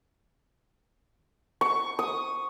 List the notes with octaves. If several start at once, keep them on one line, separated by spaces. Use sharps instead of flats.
C#6
D#6